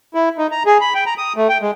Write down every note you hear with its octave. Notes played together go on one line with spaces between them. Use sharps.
E4
D#4
A#5
G#4
B5
G5
A#5
D#6
A3
G5
G#3